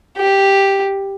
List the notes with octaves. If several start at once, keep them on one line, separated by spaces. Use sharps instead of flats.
G4